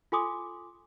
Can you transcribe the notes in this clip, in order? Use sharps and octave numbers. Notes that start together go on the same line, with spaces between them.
F4 A4 G#5 C6 D6 D#6